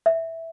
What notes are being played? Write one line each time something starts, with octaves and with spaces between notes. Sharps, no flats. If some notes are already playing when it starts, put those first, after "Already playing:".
E5